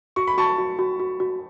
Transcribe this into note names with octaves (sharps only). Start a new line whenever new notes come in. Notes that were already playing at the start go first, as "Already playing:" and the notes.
F#4 C#6
B5
F#4 A5 C#6
F#4
F#4
F#4
F#4